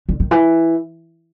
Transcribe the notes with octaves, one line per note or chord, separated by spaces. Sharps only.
D3
D#3
E3